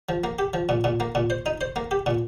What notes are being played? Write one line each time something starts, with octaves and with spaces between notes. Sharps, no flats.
F3
A#3
G4
F3
A#2
A#2
A#3
A#2
C5
D#4
C5
A#3
G4
A#2